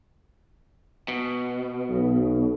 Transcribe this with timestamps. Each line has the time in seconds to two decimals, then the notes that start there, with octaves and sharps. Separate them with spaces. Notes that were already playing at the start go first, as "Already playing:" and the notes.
1.08 B2
1.90 B1